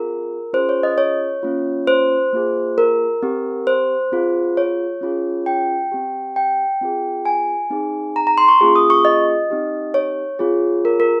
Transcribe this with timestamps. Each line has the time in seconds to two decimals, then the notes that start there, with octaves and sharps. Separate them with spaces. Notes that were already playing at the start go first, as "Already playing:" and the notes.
Already playing: C4 F4 G#4 A#4
0.53 C#4 F4 G#4 C5
0.69 C#5
0.83 D#5
0.98 C#5
1.43 A#3 C#4 F4
1.87 C5
2.33 A#3 F4 G#4
2.78 A#4
3.23 C4 G4
3.67 C5
4.12 C4 F4 G#4
4.57 C#5
5.01 C#4 F4 G#4
5.46 G5
5.92 C4 G4
6.36 G5
6.81 C4 F4 G#4
7.25 G#5
7.71 C4 D#4 G#4
8.16 A#5
8.27 A#5
8.38 C6
8.48 C#6
8.61 A#3 C#4 F4 G#4
8.76 D#6
8.90 C#6
9.05 D#5
9.50 C4 D#4 G4
9.94 C#5
10.39 C4 F4 G#4
10.85 A#4
11.00 A#4